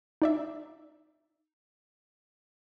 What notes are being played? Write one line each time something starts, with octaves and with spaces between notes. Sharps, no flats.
D#4 D5 E5